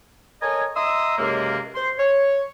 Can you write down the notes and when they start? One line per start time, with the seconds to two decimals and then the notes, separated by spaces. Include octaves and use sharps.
0.42 A4 A#4 C#5 D#5 G#5
0.76 D#5 E5 A#5 C6 D#6 E6
1.18 C#2 F#2 C3 G#3 A#3
1.75 C5 C6
1.98 C#5